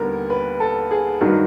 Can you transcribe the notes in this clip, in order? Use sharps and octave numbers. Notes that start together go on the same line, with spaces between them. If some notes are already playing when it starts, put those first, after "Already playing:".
Already playing: D#2 D3 G3 B3 A#4
B4
A4
G#4
G2 D#3 F#3 F#4